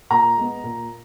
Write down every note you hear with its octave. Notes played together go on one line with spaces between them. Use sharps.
A#2 A#5
G#3 B3
A#2